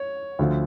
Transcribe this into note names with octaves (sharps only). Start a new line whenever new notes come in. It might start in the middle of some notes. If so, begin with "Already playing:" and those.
Already playing: C#5
D2 D3 F3